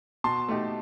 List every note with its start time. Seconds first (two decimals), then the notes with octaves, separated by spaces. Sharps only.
0.24 B2 A5 C6
0.48 A3 D#4 G4